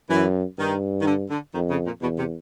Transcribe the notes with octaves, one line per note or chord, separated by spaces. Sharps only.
F#2 E3
G2 D#3
D#3
D3
D3
F2 D#3
C#3
A#2
E2 B2
C3